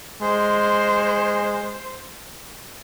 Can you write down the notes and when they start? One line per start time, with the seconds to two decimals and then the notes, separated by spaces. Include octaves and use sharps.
0.22 G#3 C5